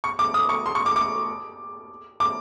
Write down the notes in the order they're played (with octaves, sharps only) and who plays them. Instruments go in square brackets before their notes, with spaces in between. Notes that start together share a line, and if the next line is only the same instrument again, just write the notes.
[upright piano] C#6
D6
D#6
C#6
C6
C#6
D6
D6
D6